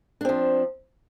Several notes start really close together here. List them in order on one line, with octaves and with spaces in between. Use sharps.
D4 C4 F3